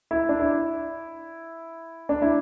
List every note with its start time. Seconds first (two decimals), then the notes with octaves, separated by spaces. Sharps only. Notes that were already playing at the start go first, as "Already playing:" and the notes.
0.11 E4
0.29 D4
0.39 E4
2.09 D4
2.22 E4